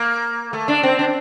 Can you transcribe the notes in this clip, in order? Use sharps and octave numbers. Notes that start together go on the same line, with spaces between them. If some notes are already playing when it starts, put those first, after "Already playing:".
Already playing: A#3
A3
D4
C4
D4